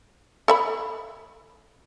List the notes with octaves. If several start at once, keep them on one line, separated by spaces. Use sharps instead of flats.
A4 E5 B5